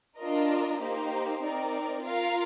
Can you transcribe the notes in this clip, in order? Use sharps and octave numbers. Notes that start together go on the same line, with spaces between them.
D4 F4 A#4 D#5
A#3 D#4 G4 C5
C4 D#4 A#4 D5
F4 A#4 F5